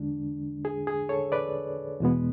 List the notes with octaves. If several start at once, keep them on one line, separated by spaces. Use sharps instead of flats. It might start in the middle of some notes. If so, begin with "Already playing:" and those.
Already playing: E2 D3 G#3 D4
G#4
G#4
A4 C#5
B4 D5
E2 B2 G#3 B3